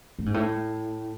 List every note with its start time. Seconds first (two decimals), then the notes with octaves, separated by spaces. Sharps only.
0.19 A2
0.26 G#2
0.34 A2